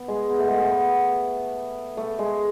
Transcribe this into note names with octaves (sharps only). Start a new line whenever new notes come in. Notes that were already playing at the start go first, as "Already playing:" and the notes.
Already playing: B3
G#3
B3
A3
G#3
A3
B3
A3
G#3